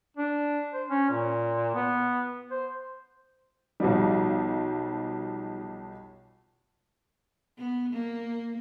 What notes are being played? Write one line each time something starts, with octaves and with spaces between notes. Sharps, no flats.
D4
C5
C#4
A#2
B3
C5
B1 F3 G3 D#4 F#4
B3
A#3